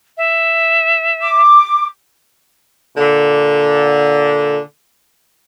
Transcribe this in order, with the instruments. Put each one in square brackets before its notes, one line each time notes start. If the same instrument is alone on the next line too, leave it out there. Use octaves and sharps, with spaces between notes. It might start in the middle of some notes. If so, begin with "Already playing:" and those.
[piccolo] E5
[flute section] D6
[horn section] A#2 D3